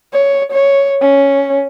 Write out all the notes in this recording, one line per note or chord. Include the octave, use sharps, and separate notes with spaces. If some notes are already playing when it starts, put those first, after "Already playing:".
C#5
C#5
C#4